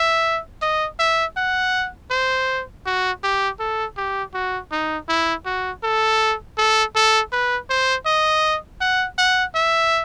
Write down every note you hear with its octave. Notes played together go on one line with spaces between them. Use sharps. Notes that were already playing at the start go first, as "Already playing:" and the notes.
Already playing: E5
D#5
E5
F#5
C5
F#4
G4
A4
G4
F#4
D#4
E4
F#4
A4
A4
A4
B4
C5
D#5
F#5
F#5
E5